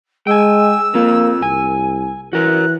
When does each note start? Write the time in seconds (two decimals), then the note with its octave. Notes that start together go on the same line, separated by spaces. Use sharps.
0.27 G#3 G5 G#5 E6
0.94 A#3 C4 F4
1.42 C2 G#5
2.33 E3 F#4 A#4 F#6